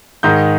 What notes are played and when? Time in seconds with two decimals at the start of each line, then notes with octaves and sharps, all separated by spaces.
0.23 G#2 D#3 G#3 D#4 G6